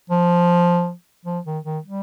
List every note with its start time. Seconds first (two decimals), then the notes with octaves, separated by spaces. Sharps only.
0.10 F3
1.26 F3
1.45 D#3
1.65 D#3
1.84 G3